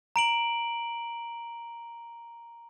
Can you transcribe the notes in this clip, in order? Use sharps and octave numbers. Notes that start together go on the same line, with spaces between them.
A#5 D7 F#7